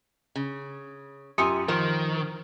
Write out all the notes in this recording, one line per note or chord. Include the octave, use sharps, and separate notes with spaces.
C#3
F#2 F4 G4 G#5 D#6 C#7
D#3 F3 A#4 C5